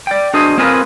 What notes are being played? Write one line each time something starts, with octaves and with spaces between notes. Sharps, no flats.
D5 G5
D4 F#4 G#4 C5 D#5
A#3 C4 F4 G#4 A#4 B4